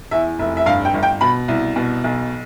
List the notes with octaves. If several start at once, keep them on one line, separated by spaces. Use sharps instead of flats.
E2 E5
F1 E5
E5
G2 F5
G5
G1
G5
B2 B5
C2
B2
B1